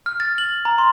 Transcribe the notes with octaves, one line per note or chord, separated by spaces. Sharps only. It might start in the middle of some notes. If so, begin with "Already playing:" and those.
F6
A6
F#7
A#5
C6